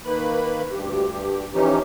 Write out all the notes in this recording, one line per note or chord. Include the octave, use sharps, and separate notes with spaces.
D#3 A#3 B4 B5
D2 G2 G4
E3 F3 C#4 D#4 G4